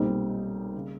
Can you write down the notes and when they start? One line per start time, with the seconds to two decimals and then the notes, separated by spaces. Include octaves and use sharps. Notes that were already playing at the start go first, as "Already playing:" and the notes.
Already playing: B1 A#2 G3 C4 D#4
0.76 C#3